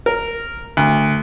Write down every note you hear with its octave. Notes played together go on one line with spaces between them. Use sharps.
A#4
D2